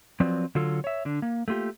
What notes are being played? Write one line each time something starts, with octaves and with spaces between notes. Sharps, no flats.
F3 F#3 C4 B4 D5
D3 F#3 F4 A4
C#5 E5
D3 D4
A#3
A3 A#3 F4 G4